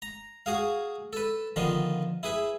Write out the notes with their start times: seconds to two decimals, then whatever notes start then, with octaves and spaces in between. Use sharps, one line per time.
0.02 A#5
0.46 F#4 G#4 F5
1.13 A4 B4
1.56 D3 D#3 F3 B3 F4
2.23 E4 G#4 B4